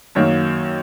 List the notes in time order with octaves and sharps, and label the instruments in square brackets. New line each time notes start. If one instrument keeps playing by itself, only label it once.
[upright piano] F#2 D#3 F#3 A#3 C#5